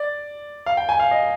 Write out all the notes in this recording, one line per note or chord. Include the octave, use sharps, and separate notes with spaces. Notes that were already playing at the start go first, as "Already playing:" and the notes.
Already playing: D5
F5
G5
G#5
F5
D#5